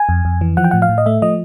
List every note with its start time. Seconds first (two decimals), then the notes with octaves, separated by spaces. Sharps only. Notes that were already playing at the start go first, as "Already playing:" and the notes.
Already playing: G#5
0.09 F2
0.25 F2
0.41 E3
0.57 F3 F#5
0.64 G5
0.71 A2 F#5
0.82 F5
0.89 A2
0.98 D#5
1.06 A3 E5
1.22 F3 D#5